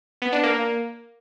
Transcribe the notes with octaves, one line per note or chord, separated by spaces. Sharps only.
B3
D4
A#3